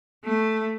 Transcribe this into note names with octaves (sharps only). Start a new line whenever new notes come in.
A3